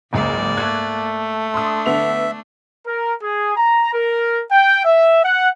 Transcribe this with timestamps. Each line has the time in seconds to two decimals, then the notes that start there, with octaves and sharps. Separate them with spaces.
0.13 F#1 C#2 G#2 A#3 D5
0.57 A3 F#6 G#6
1.54 D4 C6 D#6
1.86 D3 B3 E5 F7
2.86 A#4
3.23 G#4
3.57 A#5
3.93 A#4
4.52 G5
4.85 E5
5.24 F#5